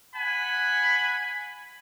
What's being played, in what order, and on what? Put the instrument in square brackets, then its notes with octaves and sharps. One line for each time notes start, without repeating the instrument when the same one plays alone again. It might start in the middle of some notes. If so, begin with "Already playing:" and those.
[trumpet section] F#5 G#5 B5